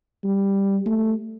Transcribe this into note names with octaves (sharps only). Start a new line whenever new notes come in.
G3
A3